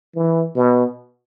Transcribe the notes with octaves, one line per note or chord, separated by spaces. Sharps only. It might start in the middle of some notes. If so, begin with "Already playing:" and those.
E3
B2